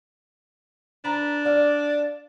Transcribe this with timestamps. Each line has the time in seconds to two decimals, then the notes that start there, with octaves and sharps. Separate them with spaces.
1.04 D4 B4 A#5
1.45 D5 F5